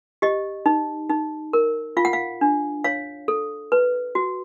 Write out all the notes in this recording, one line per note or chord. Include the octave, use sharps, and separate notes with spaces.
G4 D#5
D#4
D#4
A#4
F4 F5
F#5
F5
D4
C#5 F5
A4
B4
F#4